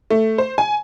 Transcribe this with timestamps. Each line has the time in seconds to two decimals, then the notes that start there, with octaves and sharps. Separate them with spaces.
0.10 A3
0.38 C5
0.58 G#5